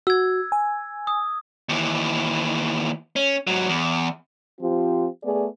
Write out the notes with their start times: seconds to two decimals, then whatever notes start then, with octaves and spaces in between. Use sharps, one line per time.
0.07 F#4 E6 G#6
0.52 G#5
1.07 D#6
1.69 D#2 E3
3.16 C#4
3.47 G#2 F#3
3.69 E2
4.61 F3 C4 F4 G4
5.24 A3 B3 G#4 D5